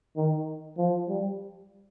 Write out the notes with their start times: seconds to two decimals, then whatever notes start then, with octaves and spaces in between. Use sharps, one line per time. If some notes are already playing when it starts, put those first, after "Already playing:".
0.16 D#3
0.77 F3
1.08 G3